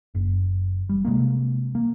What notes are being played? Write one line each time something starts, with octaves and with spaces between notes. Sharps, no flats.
F#1
G3
C3 G#3 A#3
A#3